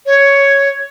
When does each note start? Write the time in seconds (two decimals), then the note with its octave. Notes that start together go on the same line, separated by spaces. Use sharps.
0.06 C#5